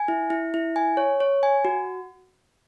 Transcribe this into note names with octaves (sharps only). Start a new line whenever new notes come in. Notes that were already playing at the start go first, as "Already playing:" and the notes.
Already playing: G#5
E4
E4
E4
G#5
C#5
C#5
G#5
F#4